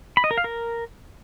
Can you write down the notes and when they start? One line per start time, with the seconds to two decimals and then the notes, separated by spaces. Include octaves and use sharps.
0.17 B5
0.24 D#5
0.31 A#4
0.37 F5
0.44 A#4